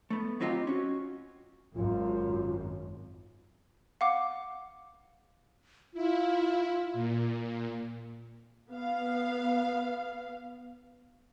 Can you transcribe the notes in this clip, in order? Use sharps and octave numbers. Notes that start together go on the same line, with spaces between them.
A3 B3
F#3 C4 D#4 F4 G4 F5
C#4 F#4
G#1 F#2 F4
F5 F#5 D6
E4 F4
A#2
B3 F5